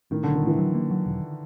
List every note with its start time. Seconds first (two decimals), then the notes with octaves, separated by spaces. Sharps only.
0.11 A2 D#3
0.23 B1 D3
0.35 D#3
0.43 A2 E3
0.59 F#3
0.75 A#3
0.91 F#3
1.06 E1